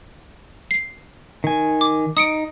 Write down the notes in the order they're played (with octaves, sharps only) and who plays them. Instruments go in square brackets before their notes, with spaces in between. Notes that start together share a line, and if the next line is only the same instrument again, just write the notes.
[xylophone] C7
[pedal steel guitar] D#3 G#5
[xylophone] D6
[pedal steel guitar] D#4 [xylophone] D#6 C#7 D7